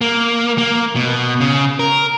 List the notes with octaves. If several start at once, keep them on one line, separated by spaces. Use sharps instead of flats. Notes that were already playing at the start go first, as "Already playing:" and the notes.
A#3
A#3
B2
C#3
A#4